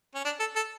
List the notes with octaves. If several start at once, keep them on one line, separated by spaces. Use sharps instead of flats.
C#4
D4
A4
A4